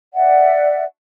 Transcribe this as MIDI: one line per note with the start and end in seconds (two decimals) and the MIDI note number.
0.14 0.83 74
0.14 0.83 76
0.14 0.83 78